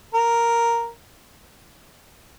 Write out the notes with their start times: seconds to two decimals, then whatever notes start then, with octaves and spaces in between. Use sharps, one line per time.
0.14 A#4